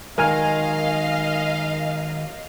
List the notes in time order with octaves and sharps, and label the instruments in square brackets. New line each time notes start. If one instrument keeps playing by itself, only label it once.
[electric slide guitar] D#3 F#3 G#3 [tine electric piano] A#4 G#5 F6 [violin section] D#5 F5